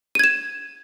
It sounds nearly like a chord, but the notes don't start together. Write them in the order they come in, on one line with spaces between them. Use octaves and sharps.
D#7 G#6 E7